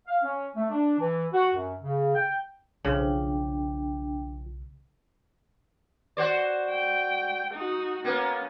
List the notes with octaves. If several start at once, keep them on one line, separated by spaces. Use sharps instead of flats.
F5
C#4
A3
D4
E3
F#4
F#2
C#3
G5
B1 C#3 F3 D4 G5
F#4 C5 D5
G5
D#4 F#4
A#3 B3 C#4